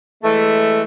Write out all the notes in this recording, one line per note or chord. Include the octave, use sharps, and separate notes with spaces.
E3 G#3 A3